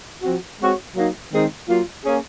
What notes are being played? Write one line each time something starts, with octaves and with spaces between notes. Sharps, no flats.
F3 C4 F#4
G#3 C4 F#4 C#5
F#3 A#3 D#4
D#3 G#3 C4 D#4 G#4
F#3 A#3 F4
A#3 C#4 G#4